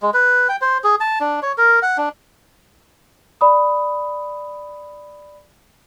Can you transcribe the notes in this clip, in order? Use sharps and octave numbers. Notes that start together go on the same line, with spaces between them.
G#3
B4
G5
C5
G#4
A5
D4
C#5
A#4
F#5
D4
D5 B5 D#6